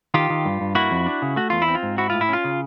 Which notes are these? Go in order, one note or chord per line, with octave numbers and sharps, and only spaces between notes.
D#3 F4 G4
D#3
G2
G2
A#3 E4 F#4
F2
D4
C#3
A3 F#4
E2 F4
E4
C4
F4
G#2
E4 F#4
A2 F4
E4
C#4 F4
C#3